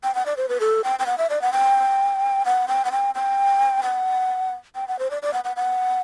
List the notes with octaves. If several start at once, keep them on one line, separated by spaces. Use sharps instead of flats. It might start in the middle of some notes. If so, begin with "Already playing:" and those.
G5
F#5
D5
C5
B4
A4
G5
G5
F#5
E5
D5
F#5
G5
F#5
G5
F#5
G5
G5
F#5
G5
F#5
C5
D5
D5
F#5
F#5
F#5